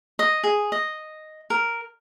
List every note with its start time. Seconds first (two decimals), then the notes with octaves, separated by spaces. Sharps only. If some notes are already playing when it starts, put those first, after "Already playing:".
0.19 D#5
0.44 G#4
0.72 D#5
1.50 A#4